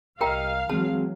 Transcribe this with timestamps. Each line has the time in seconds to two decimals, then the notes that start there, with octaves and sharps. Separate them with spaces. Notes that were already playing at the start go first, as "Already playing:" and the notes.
0.21 C2 G4 A#4 D#5 F5 G5 A#5
0.69 E3 F#3 G#3 C4 G#4 A5